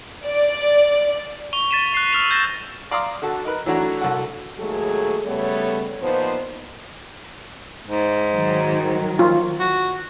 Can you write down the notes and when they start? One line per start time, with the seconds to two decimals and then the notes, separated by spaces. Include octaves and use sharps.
0.25 D5
1.53 C#6 F7 G7
1.71 A6 B6 D#7 E7
1.94 F#6 C7
2.13 E6 F6 D#7 F7
2.31 G6 A6 A#6 E7
2.91 D5 F5 A#5 C6 D6 D#6
3.22 D3 F#4 A4
3.45 D#4 A#4 B4
3.66 E3 F#3 A3 D4 F#4 A#5
4.01 C2 F#4 A4 F#5
4.59 D#2 F#3 G#3 A3 G#4 A4
5.26 C#3 G3 A3 B3 A4 C#5
6.03 A#2 F3 B3 D#4 C5
7.88 G#2
8.33 D#3 F#3
9.19 F4
9.60 F#4